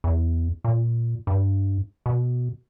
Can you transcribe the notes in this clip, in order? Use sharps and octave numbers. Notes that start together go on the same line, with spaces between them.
E2
A#2
G2
B2